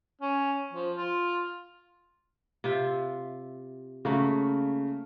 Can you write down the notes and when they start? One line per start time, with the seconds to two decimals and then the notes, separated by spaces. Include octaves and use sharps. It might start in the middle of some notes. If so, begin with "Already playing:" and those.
0.21 C#4
0.73 F3
0.96 F4
2.64 C3 F4 E5
4.05 C#3 A3 A#3 F#4